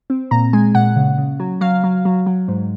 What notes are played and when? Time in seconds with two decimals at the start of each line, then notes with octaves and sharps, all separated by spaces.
0.10 C4
0.31 A#2 A#5
0.53 G#3 G#5
0.75 A#2 F#5
0.96 C#3
1.18 C#3
1.40 F#3
1.61 F#3 F5
1.84 F#3
2.05 F#3
2.26 F#3
2.48 G#2